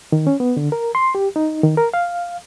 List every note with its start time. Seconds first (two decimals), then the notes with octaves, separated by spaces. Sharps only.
0.12 D#3
0.27 C#4
0.40 B3
0.57 D3
0.72 A#4
0.95 C6
1.15 G4
1.36 D#4
1.63 D#3
1.77 A#4
1.94 F5